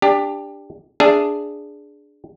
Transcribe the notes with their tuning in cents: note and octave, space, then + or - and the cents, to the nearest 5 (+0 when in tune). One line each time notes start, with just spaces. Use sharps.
D4 +0 G4 +20
D4 +0 G#4 +0 E5 +20